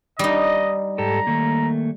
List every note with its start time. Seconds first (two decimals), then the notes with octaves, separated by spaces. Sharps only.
0.19 G3 D#4 D#5
0.98 G#2 G4 A4 A#5
1.27 D#3 A3 A#3